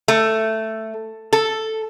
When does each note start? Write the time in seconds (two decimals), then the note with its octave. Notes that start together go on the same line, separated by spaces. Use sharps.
0.08 A3
1.33 A4